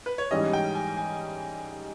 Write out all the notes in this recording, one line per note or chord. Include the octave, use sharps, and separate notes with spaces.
B4
C#5
G#2 E3 G3 C#4 D#5
G5
G#5
G#5